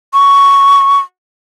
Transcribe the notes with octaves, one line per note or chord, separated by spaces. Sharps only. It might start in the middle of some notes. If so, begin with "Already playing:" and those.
C#6